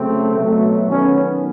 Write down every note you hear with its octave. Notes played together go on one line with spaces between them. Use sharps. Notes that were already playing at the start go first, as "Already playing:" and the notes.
Already playing: C#3 F#3 A3 C4
B2 F#3 A3
D#3 F#3 B3 C#4